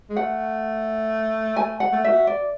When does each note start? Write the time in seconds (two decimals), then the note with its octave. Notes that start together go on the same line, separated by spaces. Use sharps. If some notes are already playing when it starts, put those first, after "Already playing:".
0.10 G#3
0.16 A3 F#5
1.56 A3 G#5
1.80 F#5
1.92 A3
2.04 E5
2.10 F#4
2.27 D5